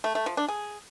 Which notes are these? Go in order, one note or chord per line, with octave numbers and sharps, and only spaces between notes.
A3
A3
F3
D4
G#4